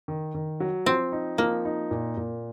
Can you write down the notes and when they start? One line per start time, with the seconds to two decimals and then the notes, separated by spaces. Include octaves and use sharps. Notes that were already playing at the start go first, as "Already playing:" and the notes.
0.08 D#3
0.35 D#3
0.60 F#3
0.86 F3 C4
1.12 D#4
1.38 F3 A#3
1.65 D#4
1.91 A#2
2.17 A#2